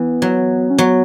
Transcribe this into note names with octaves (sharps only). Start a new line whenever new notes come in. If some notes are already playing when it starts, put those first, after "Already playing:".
Already playing: E3 B3
F#3
C#4
F#3 B3